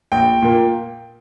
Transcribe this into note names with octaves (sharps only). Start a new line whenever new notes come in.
A#1 G5
A#2 A#3